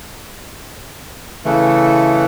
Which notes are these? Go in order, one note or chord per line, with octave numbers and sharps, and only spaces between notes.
C#3 E3 A3